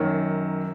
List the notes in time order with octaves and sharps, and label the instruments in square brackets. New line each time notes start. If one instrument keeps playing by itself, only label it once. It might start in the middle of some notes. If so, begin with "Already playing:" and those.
Already playing: [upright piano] F#2 D#3 F#3 A#3